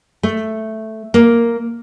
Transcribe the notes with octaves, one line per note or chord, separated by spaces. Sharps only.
A3
A#3